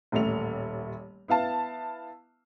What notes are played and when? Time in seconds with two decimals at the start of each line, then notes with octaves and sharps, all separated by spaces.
0.12 D#1 A1 A3 F7
1.28 B3 E4 F5 A5